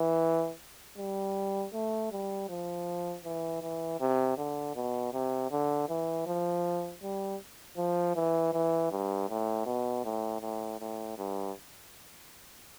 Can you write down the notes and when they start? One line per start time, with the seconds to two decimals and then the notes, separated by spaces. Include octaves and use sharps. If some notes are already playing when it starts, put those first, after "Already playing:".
Already playing: E3
0.98 G3
1.73 A3
2.11 G3
2.49 F3
3.24 E3
3.62 E3
4.00 C3
4.38 D3
4.75 B2
5.13 C3
5.51 D3
5.89 E3
6.26 F3
7.02 G3
7.77 F3
8.15 E3
8.53 E3
8.91 G2
9.29 A2
9.66 B2
10.04 A2
10.41 A2
10.80 A2
11.18 G2